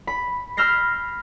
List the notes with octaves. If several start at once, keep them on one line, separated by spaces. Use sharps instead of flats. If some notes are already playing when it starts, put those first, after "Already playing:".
B5
B5 E6 F6 G6 A#6 C7